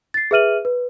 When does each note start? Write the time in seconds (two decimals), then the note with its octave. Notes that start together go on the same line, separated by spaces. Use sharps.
0.14 A6 C7
0.31 G#4 B4 E5 F6 D#7 F#7
0.65 B4